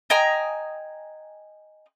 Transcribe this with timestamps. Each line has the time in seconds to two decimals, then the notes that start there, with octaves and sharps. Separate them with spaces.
0.10 D#5 G5 G#5 A#5